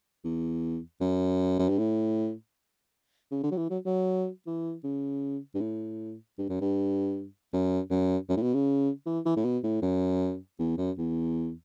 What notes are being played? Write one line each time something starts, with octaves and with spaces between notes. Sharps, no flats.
E2
F#2
F#2
G2
A2
C#3
D3
F#3
E3
F#3
F#3
E3
C#3
G2
A2
G2
F#2
G2
F#2
F#2
F#2
A2
B2
C#3
E3
E3
A2
B2
A2
F#2
E2
F#2
E2